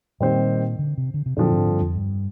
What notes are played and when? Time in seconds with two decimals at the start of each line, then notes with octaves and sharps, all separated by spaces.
0.20 A#2 D#3 G3 C4 G4 C5
0.79 D3
0.98 C3
1.14 D3
1.26 C3
1.37 A#2 D3 F3 C4
1.52 G#2
1.66 G2
1.81 F2
1.96 G2